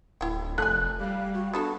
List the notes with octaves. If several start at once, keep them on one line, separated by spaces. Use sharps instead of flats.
D1 E4 G5
F1 A3 A#4 G#5 F#6
G3 F5
F#4
B3 D4 F#4 A4